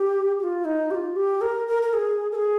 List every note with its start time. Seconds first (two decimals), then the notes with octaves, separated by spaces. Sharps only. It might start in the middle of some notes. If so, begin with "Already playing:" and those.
Already playing: G4
0.39 G4
0.43 F4
0.65 D#4
0.91 G4
0.94 F4
1.16 G4
1.41 A#4
1.68 A#4
1.82 A#4
1.93 G#4
2.32 A#4
2.35 G#4